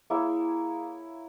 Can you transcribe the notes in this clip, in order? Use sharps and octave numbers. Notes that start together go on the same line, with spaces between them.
A#3 E4 G#4 C#5